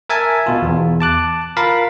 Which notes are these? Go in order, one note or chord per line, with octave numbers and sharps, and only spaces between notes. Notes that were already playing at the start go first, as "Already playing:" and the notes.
A#4 E5 G#5 A5
B2 F4
E2
A5 D6 F#6
F4 A#4 F5 A5 B5